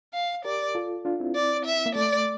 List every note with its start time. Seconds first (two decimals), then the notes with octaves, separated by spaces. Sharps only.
0.14 F5
0.45 G4 A#4 D5
0.75 F4 A4
1.05 D4 F4
1.20 C4 E4
1.35 D5
1.66 E5
1.86 A#3
1.96 A3 D5